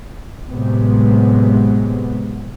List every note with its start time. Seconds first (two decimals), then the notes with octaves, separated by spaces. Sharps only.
0.48 A1 A2 C3 F#3 G#3 B3